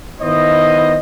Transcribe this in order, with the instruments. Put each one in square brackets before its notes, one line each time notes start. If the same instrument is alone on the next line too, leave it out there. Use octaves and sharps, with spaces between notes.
[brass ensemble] D#3 B3 E4 C5 D#5